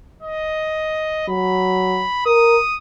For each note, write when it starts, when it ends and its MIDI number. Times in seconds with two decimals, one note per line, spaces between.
0.23 1.27 75
1.29 2.04 54
1.29 2.23 83
2.26 2.57 70
2.26 2.76 87